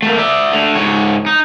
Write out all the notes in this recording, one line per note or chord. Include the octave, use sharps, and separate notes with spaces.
A3 A#3
D5 E5
D3 A3
G#2 C#5
D#4